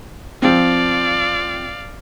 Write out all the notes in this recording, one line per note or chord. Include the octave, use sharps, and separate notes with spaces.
F3 C4 D5 F5